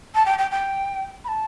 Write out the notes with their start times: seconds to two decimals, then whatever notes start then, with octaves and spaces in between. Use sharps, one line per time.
0.15 A5
0.26 G5
0.38 G5
0.51 G5
1.24 B5
1.28 A5